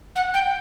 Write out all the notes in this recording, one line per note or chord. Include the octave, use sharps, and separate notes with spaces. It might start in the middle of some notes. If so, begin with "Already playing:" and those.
F#5
G5